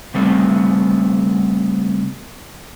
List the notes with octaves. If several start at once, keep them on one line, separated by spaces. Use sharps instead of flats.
C#3 G3 A3 B3 C4